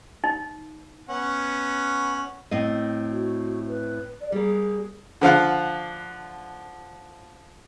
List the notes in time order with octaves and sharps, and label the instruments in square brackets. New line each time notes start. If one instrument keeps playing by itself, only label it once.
[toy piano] D#4
[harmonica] B3 C#4 F#5
[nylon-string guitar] A2 C4 D#5
[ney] F#4
B4
D5
[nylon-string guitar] G3 A#3 [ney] G#4
[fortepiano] D3 F3 F5 F#5